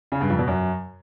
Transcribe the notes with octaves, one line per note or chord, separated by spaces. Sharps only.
C#3
G2
F2
B2
F#2